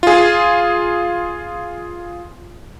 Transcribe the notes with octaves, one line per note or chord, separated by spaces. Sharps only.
F4 G#4